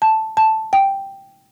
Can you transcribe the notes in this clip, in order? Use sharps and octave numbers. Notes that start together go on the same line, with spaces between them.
A5
A5
G5